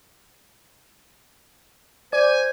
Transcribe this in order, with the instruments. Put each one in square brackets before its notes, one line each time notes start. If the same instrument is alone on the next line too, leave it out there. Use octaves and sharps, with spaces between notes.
[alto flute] C5 [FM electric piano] D5 [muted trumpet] G#5